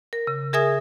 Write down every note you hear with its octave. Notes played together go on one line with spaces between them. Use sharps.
A#4
C#3
G#4 A#4 E5 G#5 D#6 G#6